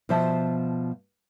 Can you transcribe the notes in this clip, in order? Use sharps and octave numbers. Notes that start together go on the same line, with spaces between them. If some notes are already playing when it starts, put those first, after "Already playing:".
B2 F3 C5 E5 A5